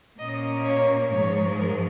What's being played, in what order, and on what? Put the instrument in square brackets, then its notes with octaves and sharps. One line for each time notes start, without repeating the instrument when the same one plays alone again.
[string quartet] A#2 A#3 C#4 D#5
C#5
G#2 F3 G#3 C#5
A#4